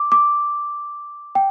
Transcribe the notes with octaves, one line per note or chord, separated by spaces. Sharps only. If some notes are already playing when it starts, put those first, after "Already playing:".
Already playing: D6
D6
G5